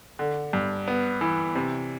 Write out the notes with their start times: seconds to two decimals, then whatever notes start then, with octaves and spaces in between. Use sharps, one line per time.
0.19 D3
0.53 G2
0.88 B3
1.21 E3
1.55 C3